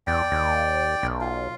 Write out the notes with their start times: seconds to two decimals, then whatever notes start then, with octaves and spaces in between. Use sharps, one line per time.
0.07 E2 D5 G5
0.31 D#2
1.03 B1
1.21 F4